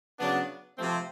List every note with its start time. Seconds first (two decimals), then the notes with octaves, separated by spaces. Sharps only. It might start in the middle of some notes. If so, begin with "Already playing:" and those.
0.19 C#3 F#3 B3 D4
0.77 C3 F3 A3 C4